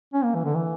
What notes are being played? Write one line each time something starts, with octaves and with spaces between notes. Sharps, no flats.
C#4
A#3
E3
D3
E3